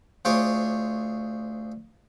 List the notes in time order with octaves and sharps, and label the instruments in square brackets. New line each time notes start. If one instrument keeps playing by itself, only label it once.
[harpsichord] D2 F4 G#4 C5 C#5 D6